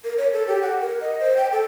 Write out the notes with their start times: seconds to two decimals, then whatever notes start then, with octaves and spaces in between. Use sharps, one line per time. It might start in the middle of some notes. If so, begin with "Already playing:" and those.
0.04 A#4
0.18 C#5
0.33 A4
0.47 G4
0.62 F#5
0.81 A#4
1.01 D#5
1.20 C5
1.37 G5
1.52 A4